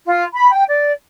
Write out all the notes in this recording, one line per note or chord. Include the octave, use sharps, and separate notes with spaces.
F4
B5
G5
D5